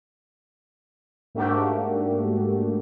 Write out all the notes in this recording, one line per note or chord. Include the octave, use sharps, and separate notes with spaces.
G#2 A3 A#3 D4 F#4 G4